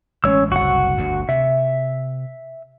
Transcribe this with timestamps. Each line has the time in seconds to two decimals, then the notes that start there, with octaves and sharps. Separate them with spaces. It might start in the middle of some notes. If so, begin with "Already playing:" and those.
0.24 A1 G#3 C#4 C#5 E6
0.52 F#1 C2 F#4 F#5
0.97 G1 D2 G2
1.29 C3 E5